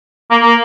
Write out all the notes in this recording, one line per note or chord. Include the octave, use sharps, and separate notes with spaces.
A#3
A#3